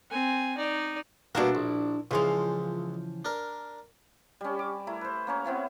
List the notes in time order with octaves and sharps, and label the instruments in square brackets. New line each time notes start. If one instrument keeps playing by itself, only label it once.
[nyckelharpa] C4 G#5
D#4 D5
[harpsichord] B2 G3 A#3 [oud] D4 E4 F#4
[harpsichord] A#1
[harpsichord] C#2 G#3 [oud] C#3 E3 F3
[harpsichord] D4 A#4
[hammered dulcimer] G3 C#4
D6
A3 E4 A#4
B4 C5
A#3 C#4 A#4
B3 C4 E4 C#5